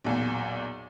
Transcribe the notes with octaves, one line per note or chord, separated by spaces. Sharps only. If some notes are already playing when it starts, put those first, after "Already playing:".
B1 E2 A#2